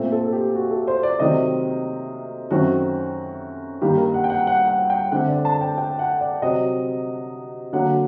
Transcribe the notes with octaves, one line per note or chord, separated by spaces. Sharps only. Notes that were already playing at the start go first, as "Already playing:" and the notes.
Already playing: A#2 A3 C4
A4
A4
G4
F#4
A4
C5
D5
C3 D#3 F#3 A3 C4 D#5
F#2 D#3 A3 C4 F#4
G2 D#3 G3 A#3 G4
A#4
F#5
G5
F#5
F#5
F#5
G5
D3 A3 C4 F#5
D5
A5
G5
G5
F#5
D5
C3 F#3 C4 D#5
D3 F#3 A#3 F#5